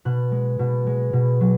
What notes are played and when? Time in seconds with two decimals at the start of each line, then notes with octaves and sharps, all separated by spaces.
0.05 B2 F#6
0.32 G#3
0.59 B2
0.86 G#3
1.13 B2
1.40 F#3